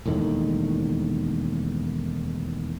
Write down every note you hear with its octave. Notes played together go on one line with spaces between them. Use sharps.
E1 D#2 A2 D#3